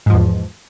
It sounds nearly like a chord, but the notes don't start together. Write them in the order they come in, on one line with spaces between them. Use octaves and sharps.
G#2 F3 E2